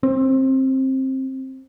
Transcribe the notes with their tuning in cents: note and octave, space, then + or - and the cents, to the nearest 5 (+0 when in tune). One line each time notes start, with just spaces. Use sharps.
C4 +20